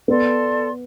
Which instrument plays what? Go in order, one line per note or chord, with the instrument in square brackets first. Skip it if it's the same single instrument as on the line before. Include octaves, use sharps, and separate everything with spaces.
[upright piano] B3 [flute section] A4 D5 A5 C6